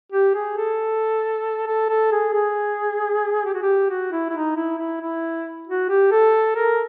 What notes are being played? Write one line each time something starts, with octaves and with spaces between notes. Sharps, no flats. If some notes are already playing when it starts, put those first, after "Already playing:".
G4
G#4
A4
A4
A4
G#4
G#4
G4
F#4
G4
F#4
E4
E4
D#4
E4
E4
E4
F#4
G4
A4
A#4